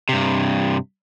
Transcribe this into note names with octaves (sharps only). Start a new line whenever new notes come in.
G2 C3